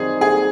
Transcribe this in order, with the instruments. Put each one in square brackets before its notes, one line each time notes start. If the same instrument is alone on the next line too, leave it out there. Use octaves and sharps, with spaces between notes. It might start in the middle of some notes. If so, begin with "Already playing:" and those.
Already playing: [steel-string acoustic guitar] F#2 D#3 G3 C4 D#4 [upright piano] G#4
[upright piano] G#4